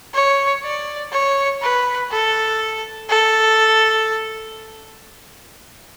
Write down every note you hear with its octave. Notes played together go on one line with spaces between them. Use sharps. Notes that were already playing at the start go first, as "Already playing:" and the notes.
C#5
D5
C#5
B4
A4
A4